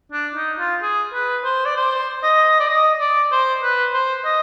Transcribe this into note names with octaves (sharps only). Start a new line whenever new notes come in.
D4
D#4
F4
G#4
B4
C5
D5
C5
D#5
D5
D#5
D5
C5
B4
C5
D#5